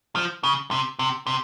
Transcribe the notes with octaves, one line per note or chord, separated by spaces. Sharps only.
F3
C#3
C3
C3
C3